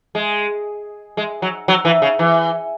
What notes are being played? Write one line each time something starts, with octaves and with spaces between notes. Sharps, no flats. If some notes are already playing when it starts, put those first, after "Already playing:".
G#3
G#3
F#3
F#3
E3
C#3
E3